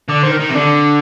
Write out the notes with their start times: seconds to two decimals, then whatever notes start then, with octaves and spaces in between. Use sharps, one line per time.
0.09 D3 D5
0.23 D#3 C5
0.31 A#4
0.40 D#3
0.49 C3
0.55 D3 D4